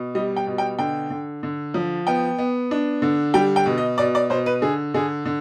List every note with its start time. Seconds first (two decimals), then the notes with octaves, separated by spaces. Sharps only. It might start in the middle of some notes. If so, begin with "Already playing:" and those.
Already playing: B2
0.15 G3 D#5
0.36 G5
0.47 B2
0.58 G5
0.79 D3 G5
1.10 D3
1.43 D3
1.74 F3
2.07 B3 G5
2.38 B3
2.71 D4
3.02 D3
3.34 G3 G5
3.56 G5
3.66 B2
3.78 D#5
3.98 B2 D5
4.15 D5
4.30 B2 C5
4.46 B4
4.62 D3 G#4
4.94 D3 G#4
5.25 D3